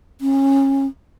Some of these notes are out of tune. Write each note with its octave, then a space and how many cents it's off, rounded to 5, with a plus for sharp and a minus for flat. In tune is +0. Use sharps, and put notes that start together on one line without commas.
C#4 -25